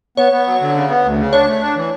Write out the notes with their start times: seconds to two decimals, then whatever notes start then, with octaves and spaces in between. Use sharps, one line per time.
0.17 B3 C#5
0.32 B3
0.46 F#3
0.61 D3
0.75 C#3
0.89 B3
1.04 D2
1.18 C#3
1.32 D4 C#5
1.48 A3
1.61 D4
1.76 E3